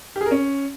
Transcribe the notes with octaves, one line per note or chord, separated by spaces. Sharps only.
G4
G#4
A#4
C#4